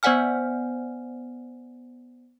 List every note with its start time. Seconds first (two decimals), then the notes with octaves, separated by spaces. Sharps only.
0.03 B3 C5 D5 F#5 G#5 F6